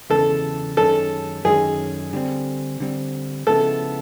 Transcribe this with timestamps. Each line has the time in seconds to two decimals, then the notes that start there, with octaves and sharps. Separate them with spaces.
0.10 E2 C#3 E3 G#3 A4
0.77 F#2 D#3 G#3 C#4 A4
1.45 F#2 D#3 G#3 C#4 G#4
2.13 D3 G3 C4
2.80 D3 G3 C4
3.47 C#3 F3 G#3 B3 E4 A4